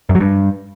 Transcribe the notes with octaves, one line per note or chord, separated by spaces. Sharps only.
F#2
F#3
G2